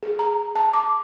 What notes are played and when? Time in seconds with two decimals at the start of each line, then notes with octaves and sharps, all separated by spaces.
0.03 G#4
0.19 A#5
0.55 A5
0.73 D6